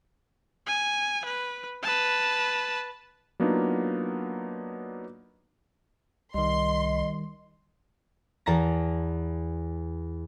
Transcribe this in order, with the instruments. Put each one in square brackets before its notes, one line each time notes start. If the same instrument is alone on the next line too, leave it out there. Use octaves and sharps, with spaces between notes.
[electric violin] G#5
B4
B4 A5
[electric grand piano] F#3 A#3 B3 D4 D#4 F4
[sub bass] C2 [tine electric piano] D#3 G3 [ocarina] D#5 [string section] C6
[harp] E2 A5 A#5 A#6